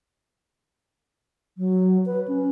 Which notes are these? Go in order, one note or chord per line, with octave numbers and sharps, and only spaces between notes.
F#3
B4
C#4